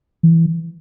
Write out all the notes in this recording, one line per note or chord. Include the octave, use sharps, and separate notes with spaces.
E3